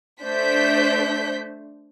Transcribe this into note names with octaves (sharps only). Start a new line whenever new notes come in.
A3 D4 C5 G6 B6